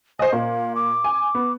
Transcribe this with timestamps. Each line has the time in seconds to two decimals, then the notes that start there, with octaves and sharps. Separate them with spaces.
0.19 C5 D#5 G#5
0.33 A#2 F5
0.75 D6
1.04 G#5
1.35 B3